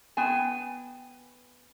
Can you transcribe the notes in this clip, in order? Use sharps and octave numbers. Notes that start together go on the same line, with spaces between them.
B3 G5 G#5